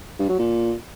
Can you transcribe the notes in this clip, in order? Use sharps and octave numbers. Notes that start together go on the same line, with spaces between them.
G2
F#3
A#2